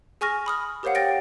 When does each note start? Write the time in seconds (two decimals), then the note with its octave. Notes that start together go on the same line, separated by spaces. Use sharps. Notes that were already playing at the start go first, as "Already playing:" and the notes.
0.21 G#4 G#5 C#6 F6 A#6
0.46 B5 D#6 F6
0.83 G4 A#4 C5 C#5 F5 F#5
0.95 G5 A6 A#6 D7